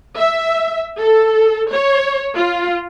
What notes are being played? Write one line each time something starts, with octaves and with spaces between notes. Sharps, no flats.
E5
A4
C#5
F4